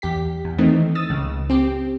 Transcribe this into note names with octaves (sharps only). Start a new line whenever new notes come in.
E2 G4 B6
E2
D#3 E3 A3 C4 D#4
D#6 E6 A6
C#2 C#3
C4 G4